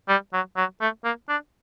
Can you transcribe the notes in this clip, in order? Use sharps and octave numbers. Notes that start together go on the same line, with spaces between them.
G3
F#3
F#3
A3
A#3
D4